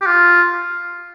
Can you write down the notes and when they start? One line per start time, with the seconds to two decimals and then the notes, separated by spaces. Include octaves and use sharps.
0.02 G4
0.06 F4